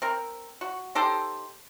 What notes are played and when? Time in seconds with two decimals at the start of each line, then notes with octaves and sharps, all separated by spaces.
0.02 C4 A#4
0.61 F#4
0.95 D#4 G4 A4 C5